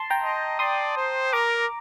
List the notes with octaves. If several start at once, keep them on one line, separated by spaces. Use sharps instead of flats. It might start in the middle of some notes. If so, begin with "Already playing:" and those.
Already playing: A5 C6
G5 A#5
D#5
D5 C6 D#6
C5
A#4 A#5 D6